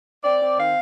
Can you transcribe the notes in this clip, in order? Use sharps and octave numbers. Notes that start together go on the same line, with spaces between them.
C4 D5
C4
D#3 F5